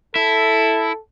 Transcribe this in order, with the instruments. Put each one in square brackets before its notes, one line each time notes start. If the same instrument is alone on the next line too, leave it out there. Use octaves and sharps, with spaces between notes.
[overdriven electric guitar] E4 [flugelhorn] A4